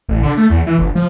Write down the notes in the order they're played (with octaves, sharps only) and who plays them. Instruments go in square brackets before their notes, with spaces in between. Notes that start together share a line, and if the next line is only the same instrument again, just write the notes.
[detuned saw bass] A1
D3
A3
E2
E3
G1
F3